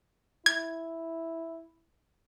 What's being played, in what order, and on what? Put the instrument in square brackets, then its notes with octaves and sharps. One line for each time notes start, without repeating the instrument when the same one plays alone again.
[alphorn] E4 [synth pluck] G#6